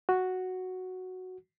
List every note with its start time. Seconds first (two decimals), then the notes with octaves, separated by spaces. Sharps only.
0.09 F#4